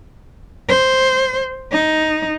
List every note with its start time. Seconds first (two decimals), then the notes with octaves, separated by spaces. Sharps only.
0.69 C5
1.72 D#4